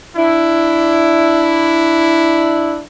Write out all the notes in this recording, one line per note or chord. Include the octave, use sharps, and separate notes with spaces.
D4 E4